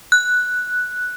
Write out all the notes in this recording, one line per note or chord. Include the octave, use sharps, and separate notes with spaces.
F#6